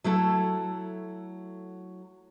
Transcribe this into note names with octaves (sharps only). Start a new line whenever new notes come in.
F#3 A3 E4 A4